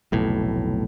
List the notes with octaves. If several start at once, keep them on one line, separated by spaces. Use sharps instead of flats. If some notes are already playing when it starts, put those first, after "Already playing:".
F1 B1 A2